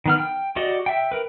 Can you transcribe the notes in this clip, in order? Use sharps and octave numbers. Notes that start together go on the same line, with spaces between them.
D#3 B3 F6
G5
F#4 G4 D5 D#5
E5 G5
A#4 B4